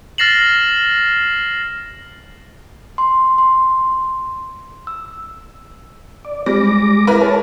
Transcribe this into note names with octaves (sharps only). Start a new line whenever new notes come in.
F6 A6 A#6 C7 E7 F#7
C6
C6
E6
D5
G3 G#3 D6 A#6
E4 A#4 B4
G#4 C#5 A5